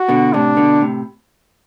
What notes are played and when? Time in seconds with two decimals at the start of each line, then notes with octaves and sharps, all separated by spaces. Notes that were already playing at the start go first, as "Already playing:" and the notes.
Already playing: F#4
0.08 B2 D3
0.34 A2 C3 D4
0.57 B2 D3
0.81 A2 C3